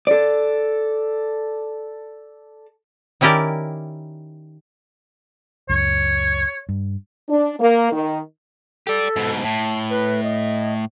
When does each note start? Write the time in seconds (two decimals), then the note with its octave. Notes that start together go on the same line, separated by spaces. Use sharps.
0.07 A4 D5
3.21 D#3 C#4 E4 G4 A#4 D5
5.69 C#2 F#2 C#5
6.69 G2
7.29 D4
7.60 A#3
7.92 D#3
8.87 G4 A4 D5
9.16 G#2 B2
9.44 A2 A5
9.90 B4
10.23 D#5